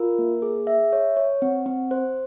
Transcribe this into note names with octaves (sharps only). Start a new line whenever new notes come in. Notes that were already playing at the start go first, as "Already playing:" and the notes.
Already playing: F4 A#4
A#3
G#4
E5
C#5
C#5
C4
C4
C5